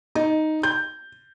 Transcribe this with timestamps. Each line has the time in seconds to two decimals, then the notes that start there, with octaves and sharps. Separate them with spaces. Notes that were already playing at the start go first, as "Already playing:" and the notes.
0.15 D#4
0.63 G6